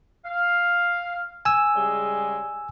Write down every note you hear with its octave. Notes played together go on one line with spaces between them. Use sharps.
F5
G#5 E6
C#3 G3 G#3